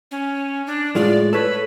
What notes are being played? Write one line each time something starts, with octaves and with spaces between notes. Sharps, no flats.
C#4
D4
A2 G#3 F4 D5
A4 B4 C#5